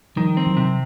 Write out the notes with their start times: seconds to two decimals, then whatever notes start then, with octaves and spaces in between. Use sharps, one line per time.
0.16 D#3 F3 G3
0.37 C4
0.46 E3 F#3
0.57 C3